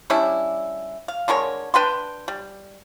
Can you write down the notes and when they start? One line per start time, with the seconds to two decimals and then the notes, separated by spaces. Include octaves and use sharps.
0.10 G3 C#4 D4 E4
1.08 F5
1.28 D3 G#3 A#4 C#5
1.74 D4 B4 G5 C6
2.28 G3